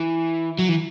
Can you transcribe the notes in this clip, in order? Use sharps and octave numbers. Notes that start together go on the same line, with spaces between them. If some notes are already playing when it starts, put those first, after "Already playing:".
Already playing: E3
F#3
E3